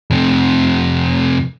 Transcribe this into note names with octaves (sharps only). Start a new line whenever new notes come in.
F2 C3